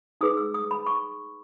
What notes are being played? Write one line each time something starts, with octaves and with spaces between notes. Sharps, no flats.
D#4 G#4 B4 D#6
E6
D#6
B5
C#6